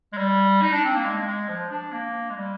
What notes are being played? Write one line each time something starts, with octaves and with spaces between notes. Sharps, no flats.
G#3
G3
D#4
D4
C4
A#3
G#3
G#3
F3
D4
A#3
G#3
G3